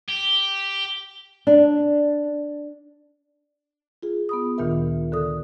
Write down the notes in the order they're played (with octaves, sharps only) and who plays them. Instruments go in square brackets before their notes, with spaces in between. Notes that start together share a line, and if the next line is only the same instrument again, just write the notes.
[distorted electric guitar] G4
[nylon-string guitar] D4
[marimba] F4 G#4
B3 B5 D#6
D2 A#2 D#3 F4 A#4 E5
D3 A4 D#6